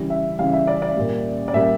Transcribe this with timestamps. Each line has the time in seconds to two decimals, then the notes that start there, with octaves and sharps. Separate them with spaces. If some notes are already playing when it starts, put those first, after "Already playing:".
Already playing: C#3 E3 G3
0.10 E5
0.39 C#3 E3 G3 F5
0.53 E5
0.67 D5
0.82 D5
0.97 A#2 G3
1.48 D5
1.53 A#2 G3 E5